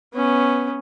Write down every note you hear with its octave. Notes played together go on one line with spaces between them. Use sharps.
B3 C#4